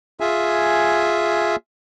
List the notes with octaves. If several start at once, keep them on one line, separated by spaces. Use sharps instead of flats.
F4 G#4 E5 G#5